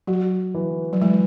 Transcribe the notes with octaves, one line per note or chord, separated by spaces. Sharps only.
F#3 F#4
E3
F#3
E3 G#3